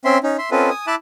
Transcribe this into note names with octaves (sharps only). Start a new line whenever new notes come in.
C4 C#4 E5 C6
C#4 D#4
E5 C6
C4 C#4 F4 A4 B4 D#5
G#5 D#6
E4 E5 A5 D6 F#6